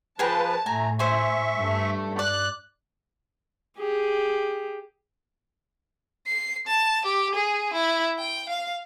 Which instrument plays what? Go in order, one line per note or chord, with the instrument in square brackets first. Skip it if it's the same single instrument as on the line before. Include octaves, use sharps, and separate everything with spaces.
[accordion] F3 B4 [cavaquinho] G#4 A#4 G5 [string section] A5
[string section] A2 [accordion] A3 A#5 [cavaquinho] G#5
[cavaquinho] C5 G#5 [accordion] E5 C#6
[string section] G2 A3
[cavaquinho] D5 [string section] F#6
[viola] G4 G#4
[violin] C7
A5
G4
G#4
E4
G5
F5